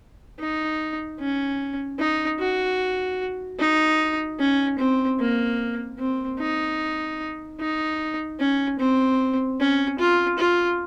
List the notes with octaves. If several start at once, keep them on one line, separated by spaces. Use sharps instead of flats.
D#4
C#4
D#4
F#4
D#4
C#4
C4
A#3
C4
D#4
D#4
C#4
C4
C#4
F4
F4